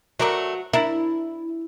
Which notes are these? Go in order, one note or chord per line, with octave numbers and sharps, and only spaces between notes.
F#3 A3 A#4 D5
D4 E4 A#4